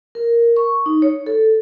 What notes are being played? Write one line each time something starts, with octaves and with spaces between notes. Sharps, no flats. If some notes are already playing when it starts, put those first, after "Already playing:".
A#4
C#6
D#4
C#5
A4